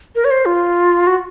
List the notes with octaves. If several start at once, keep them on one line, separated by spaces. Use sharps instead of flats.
A#4
C#5
C5
F4
F#4